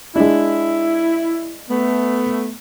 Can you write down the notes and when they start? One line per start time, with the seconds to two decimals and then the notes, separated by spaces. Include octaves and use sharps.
0.16 G#3 D4 E4
1.69 A3 B3